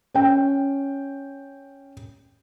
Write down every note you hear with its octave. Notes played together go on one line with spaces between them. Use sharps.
C#4 G5